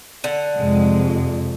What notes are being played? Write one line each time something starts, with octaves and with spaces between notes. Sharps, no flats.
D3 F#5
F2 C3 G#3